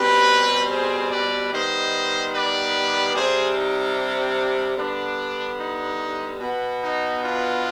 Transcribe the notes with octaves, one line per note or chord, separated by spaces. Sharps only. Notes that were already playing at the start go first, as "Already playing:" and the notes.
Already playing: B2 G3 C4 G4 B4
G#4 C5
B4 D5
D#3 G3 B3 C5 D#5
B4 D5
C3 G3 C4 G#4 C5
D#4
D4
D3 G3 B3 D4
D#4
B2 B3
D#4
D4 F4